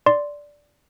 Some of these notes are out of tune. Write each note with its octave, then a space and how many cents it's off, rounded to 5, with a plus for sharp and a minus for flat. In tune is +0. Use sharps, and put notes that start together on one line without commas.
D5 -5 C6 +0